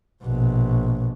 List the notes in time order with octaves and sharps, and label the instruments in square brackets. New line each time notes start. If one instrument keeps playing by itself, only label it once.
[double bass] A#1 B2